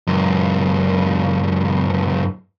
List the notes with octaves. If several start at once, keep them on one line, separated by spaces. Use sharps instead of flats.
C#2 F#2